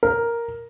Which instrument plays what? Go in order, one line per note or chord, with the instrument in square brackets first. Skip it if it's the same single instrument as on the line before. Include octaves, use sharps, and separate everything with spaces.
[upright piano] A#4